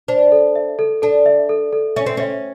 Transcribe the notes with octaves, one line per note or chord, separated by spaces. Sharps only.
D4 C5
A4
E5
A4
D4 A4
E5
A4
A4
C#4 E5
C4
C#4 E5